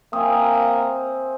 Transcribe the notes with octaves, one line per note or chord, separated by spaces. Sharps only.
A#3 C4 E5 G#5 D#6